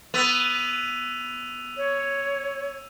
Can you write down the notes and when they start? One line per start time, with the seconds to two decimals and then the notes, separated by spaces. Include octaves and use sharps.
0.14 B3 E6 D#7 F7
1.77 C#5